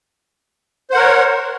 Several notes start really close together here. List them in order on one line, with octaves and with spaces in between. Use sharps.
C5 F#5 A#4 C#5